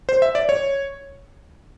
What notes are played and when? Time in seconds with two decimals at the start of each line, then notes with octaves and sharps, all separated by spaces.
0.09 C5
0.22 E5
0.35 D5
0.49 C#5